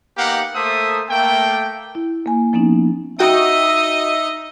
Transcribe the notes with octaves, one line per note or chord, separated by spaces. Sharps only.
A#3 B3 D#4 G4 F5 F#5
A3 A#3 A4 C5 E5 D#6
A3 A#3 G5
E4
A#3 G#5
F3 A#3 B3 C#4 D#4
D#4 F#4 D#5 E5 G5 D#6